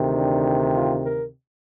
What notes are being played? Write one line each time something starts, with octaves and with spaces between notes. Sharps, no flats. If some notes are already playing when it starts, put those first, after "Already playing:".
Already playing: D2 C3 D#3
D4
F4
A#4